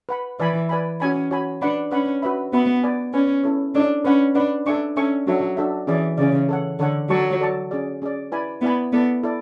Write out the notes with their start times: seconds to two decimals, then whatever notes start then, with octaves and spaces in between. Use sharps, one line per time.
0.09 B4 F#5 B5
0.40 E3 B4 D5 G#5 B5
0.69 B4 D5 G#5 B5
1.00 C#4 F#4 C#5 G#5 B5
1.31 F#4 C#5 G#5 B5
1.62 D4 B4 F#5 B5
1.92 C#4 B4 F#5 B5
2.22 F#4 B4 E5 B5
2.53 B3 F#4 B4 E5 B5
2.83 B4 D5 G#5
3.14 C#4 B4 D5 G#5
3.44 C#4 E4 A4 C#5
3.75 C#4 D4 E4 A4 C#5
4.05 C#4 B4 F#5 B5
4.35 D4 B4 F#5 B5
4.66 D4 A4 E5 G#5 C#6
4.97 C#4 A4 E5 G#5 C#6
5.27 F#3 D4 F#4 A4 E5
5.57 D4 F#4 A4 E5
5.87 E3 C#4 G#4 D5
6.18 C#3 C#4 G#4 D5
6.49 A4 C#5 F#5
6.79 D3 A4 C#5 F#5
7.10 F#3 A4 D5 A5 C#6
7.40 A4 D5 A5 C#6
7.71 C#4 G#4 D5
8.02 C#4 G#4 D5
8.32 E4 B4 D5 G#5 B5
8.62 B3 E4 B4 D5 G#5 B5
8.93 B3 E4 A4 D5
9.23 E4 A4 D5